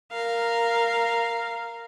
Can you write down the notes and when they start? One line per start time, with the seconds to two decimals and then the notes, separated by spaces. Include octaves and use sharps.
0.12 A#4 F5